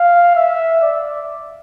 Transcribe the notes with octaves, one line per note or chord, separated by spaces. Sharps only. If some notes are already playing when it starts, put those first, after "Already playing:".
Already playing: F5
E5
D5